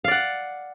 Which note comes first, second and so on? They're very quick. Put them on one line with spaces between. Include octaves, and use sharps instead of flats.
F5 D5 F#5